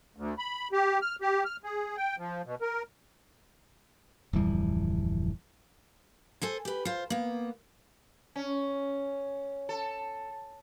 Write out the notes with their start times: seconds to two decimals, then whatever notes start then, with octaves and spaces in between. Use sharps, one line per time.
0.16 D2
0.38 B5
0.72 G4
1.02 F6
1.21 G4
1.45 F6
1.64 G#4
1.97 G5
2.18 F3
2.45 B2
2.61 A#4
4.33 D1 F2 E3 G3
6.42 A4 C5 G#5
6.65 G4 B4
6.85 F4 C5
7.10 A#3 B3
8.36 C#4
9.69 A4